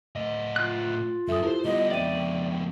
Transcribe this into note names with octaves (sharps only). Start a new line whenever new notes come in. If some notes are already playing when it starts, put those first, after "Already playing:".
A2 D#5
F4 F#6
F#2 A4 E5 G#5 D#6
E4 G4 A#4 C5
G3 B3 D#5
F2 B2 D5 E5 G5 D#7